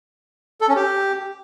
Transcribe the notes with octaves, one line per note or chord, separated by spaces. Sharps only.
A4
C#4
G4